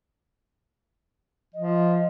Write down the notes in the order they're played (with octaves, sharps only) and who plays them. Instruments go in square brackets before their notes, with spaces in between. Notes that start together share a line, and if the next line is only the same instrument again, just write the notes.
[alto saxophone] F3 [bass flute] D#5